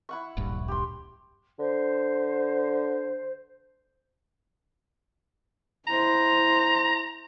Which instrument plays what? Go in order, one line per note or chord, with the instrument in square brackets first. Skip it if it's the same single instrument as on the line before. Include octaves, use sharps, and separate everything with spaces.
[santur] E4 F#5 C#6
[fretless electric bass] D1 A#1 G2
[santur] G4 C6
[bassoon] D3 [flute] C5
[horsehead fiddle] E4 C5 [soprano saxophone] A#5